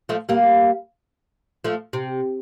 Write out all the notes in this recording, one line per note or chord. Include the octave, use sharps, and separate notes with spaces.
F3 A3
G3 A#3
F3 A3
C3